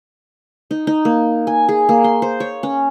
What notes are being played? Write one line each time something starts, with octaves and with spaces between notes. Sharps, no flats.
D#4
D#4
A#3
G#5
G#4
A#3
C6
C5
C#5
C#4